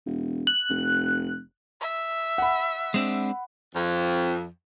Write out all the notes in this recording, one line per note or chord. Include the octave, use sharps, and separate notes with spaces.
E1
F#6
F1
E5
F#5 B5
G#3 C4 D4
F2